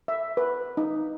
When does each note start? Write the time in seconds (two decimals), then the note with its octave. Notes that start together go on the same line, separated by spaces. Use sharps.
0.08 E5
0.37 B4
0.77 D#4